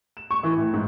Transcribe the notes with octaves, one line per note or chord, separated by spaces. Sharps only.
E7
C#6
E3
A2
G#2